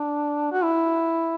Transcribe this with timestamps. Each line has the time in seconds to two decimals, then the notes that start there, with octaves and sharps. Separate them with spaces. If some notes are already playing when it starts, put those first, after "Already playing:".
Already playing: D4
0.52 F#4
0.63 E4